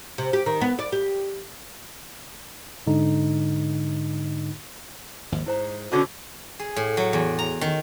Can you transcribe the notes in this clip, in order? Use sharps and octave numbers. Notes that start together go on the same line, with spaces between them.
C3
G4
D#3
B3
D5
G4
G#2 D3 D#4
G#1 D#2 F3
G#2 E4 C5 A#5
B2 D3 C#4 F#4
G#4
A2
F#3
E2
A#5
D#3